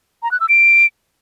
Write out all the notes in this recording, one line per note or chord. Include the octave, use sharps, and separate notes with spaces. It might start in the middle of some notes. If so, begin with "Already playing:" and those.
A#5
F#6
E6
D7